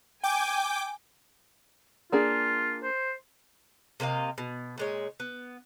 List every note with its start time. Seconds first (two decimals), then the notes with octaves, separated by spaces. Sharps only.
0.24 G5 G#5 D6
2.12 A#3 D4 F4 G#4
2.83 C5
4.00 C3 A#3 D#5 F5
4.38 B2
4.78 A#2 G#3 C#5
5.20 B3